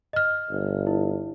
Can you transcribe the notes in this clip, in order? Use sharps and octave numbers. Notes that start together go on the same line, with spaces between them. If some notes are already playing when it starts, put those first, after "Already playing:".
D#5 F6
G1
E4